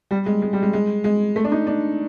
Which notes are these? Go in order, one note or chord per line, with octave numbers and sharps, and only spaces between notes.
G3
G#3
G#3
G3
G#3
G#3
G#3
A3
D4
D#4
D4